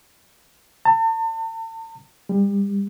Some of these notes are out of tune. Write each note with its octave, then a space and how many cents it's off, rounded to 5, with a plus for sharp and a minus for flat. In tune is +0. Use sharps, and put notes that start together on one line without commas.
A5 +40
G3 +30